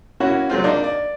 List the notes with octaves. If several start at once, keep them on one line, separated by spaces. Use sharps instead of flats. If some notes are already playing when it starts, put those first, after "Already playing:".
A#3 C#4 E4 F#4
F#3 G#3 C4 F4
A#3 D4 D#4
D5